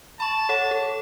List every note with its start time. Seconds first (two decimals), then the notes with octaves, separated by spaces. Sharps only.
0.20 A5 B5 C#6
0.49 A4 C#5 F#5
0.71 A4